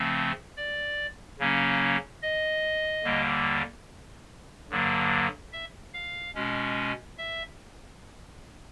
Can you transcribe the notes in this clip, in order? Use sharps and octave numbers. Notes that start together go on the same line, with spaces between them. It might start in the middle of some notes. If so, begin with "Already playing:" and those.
Already playing: C#3 F3 A3 C4
D5
C#3 F#3 A#3 C#4
D#5
D#2 D3 G3 A#3
G2 D3 F#3 A#3
E5
F5
B2 G#3 C#4
E5